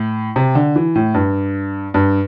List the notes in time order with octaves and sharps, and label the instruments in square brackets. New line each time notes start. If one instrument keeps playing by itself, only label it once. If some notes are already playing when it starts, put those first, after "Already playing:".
Already playing: [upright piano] A2
C3
D3
E3
A2
G2
G2